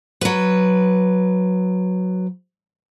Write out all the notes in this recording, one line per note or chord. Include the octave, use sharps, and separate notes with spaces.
F#3 B4